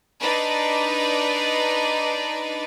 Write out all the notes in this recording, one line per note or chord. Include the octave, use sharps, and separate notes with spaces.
D4 D#4 B4 D5